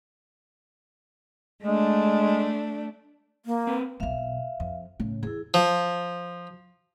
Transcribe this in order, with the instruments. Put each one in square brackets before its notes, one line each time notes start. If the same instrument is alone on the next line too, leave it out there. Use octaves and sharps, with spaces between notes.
[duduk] G#3 [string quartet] A3 D4
[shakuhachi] A#3
[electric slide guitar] C4 B4
[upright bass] B1 B2 [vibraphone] E5 F5
[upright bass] F2
A2 C#3
[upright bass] E2 [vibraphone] E4 G#4
[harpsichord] F3